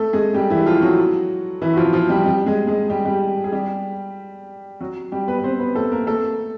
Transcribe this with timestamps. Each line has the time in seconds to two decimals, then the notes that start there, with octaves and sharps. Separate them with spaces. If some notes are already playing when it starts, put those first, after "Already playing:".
Already playing: A3 A4
0.13 G#3 G#4
0.34 G3 G4
0.50 E3 E4
0.66 F3 F4
0.82 F#3 F#4
1.61 E3 E4
1.74 F#4
1.77 F3 F4
1.93 F3 F4
2.09 G3 G4
2.26 G3 G4
2.46 G#3 G#4
2.67 G#3 G#4
2.90 G3 G4
3.05 G3 G4
3.44 G#4
3.52 G3 G4
4.80 F#3 F#4
5.12 G3 G4
5.28 B3 B4
5.39 B4
5.44 C4 C5
5.60 B3 B4
5.75 A3 A4
5.92 A#3 A#4
6.07 A3 A4